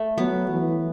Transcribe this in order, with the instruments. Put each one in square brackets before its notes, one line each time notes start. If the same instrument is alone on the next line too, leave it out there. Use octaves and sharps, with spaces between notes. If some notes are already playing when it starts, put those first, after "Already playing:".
Already playing: [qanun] A3
[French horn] F#3 [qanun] B3
[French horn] E3